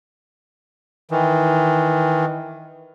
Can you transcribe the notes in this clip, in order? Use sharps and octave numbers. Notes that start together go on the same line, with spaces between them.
D#3 E3